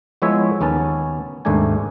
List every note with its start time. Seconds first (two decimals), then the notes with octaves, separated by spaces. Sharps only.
0.22 F3 G#3 B3 E4 C#5 E5
0.61 D#2 B3 C#4 A5
1.45 G#1 D#2 G#2 A3 D4 G#5